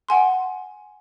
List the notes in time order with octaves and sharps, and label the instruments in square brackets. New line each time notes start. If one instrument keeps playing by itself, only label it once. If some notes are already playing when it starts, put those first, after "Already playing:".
[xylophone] F#5 G#5 C6